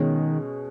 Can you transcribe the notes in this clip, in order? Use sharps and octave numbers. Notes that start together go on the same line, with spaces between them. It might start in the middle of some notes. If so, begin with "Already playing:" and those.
Already playing: B2 D#3 G#3 C#4